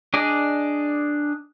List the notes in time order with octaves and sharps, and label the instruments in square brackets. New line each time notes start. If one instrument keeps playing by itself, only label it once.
[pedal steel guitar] D4 G#4 D5 D#5